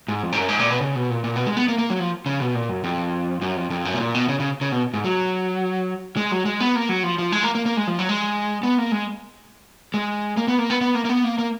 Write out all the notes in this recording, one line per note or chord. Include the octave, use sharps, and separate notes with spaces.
G#2
F2
G#2
F#2
G#2
A#2
B2
C#3
B2
A#2
A#2
B2
G#3
B3
A#3
A#3
F#3
F3
C#3
B2
A#2
F#2
F2
F#2
F2
F2
F#2
B2
A#2
B2
C#3
C#3
C#3
B2
G#2
F#3
G#3
F#3
G#3
B3
A#3
F#3
F3
F3
G#3
A#3
A#3
A#3
G#3
F3
F#3
G#3
B3
A#3
G#3
G#3
A#3
B3
A#3
B3
B3
A#3
A#3
B3
A#3
A#3